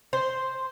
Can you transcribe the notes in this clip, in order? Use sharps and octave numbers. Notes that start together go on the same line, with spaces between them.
C5